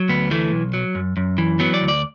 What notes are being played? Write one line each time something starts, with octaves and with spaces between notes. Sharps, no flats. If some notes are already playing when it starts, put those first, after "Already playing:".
Already playing: F#3
D2 B3
E3 A3
B1
F#3
F#2
F#2
E3
F#3 B3
D5
D2
D5